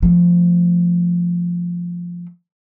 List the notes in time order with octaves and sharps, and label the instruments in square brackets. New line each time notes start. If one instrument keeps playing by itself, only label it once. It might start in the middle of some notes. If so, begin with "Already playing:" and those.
[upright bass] F3 A3